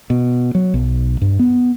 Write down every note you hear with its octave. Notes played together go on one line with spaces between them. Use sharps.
B2
F#3
B1
G2
B3